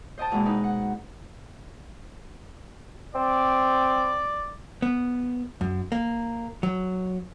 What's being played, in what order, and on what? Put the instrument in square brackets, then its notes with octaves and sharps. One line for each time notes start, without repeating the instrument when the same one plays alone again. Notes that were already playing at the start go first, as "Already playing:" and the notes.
[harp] C5 D#5 G5 A5
E2 B2 G#3 A#3 C4
D#4 B4
F#5
[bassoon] C4 [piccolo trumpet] D5
[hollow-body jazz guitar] B3
F#2
A#3
F#3